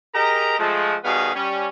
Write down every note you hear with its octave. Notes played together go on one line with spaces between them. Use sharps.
G4 G#4 A#4 D#5 A#5
F3 G#3 A3
B2 D#3 G3 B3 G#4 F5
G3 C#4